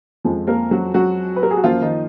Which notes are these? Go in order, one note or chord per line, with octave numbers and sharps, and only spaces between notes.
F2 F3 G#3
A#3 A#4
F#3 F#4
F#3 F#4
B4
A#4
G#4
F#4
F#2 F3 A#3 F4
D#3 D#4